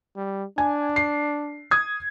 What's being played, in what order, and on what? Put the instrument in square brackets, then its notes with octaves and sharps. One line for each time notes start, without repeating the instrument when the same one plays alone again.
[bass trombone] G3
[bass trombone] D4 [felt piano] G#5
[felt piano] C7
D#6 G#6